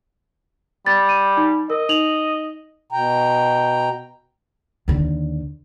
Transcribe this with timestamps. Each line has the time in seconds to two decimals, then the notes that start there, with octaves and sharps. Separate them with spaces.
0.86 G3 A6
1.09 D#7
1.37 D#4
1.70 A#4 D#5
1.89 D#4 F7 F#7
2.91 B2 G5 A#5
4.88 D#2 D3